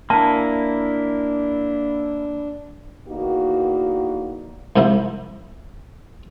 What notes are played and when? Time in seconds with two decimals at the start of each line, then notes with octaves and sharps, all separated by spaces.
0.10 A#3 D4 E4 A5
3.08 E2 D#3 A#3 D#4 F#4
4.76 C2 G#2 C3 F3 E4